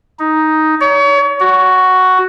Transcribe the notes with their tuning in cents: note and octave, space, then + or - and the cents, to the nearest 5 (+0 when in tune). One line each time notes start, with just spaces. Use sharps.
D#4 +5
C#5 +35
F#4 +5